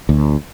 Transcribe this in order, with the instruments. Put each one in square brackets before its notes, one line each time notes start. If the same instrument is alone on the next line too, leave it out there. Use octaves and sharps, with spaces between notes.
[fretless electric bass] D2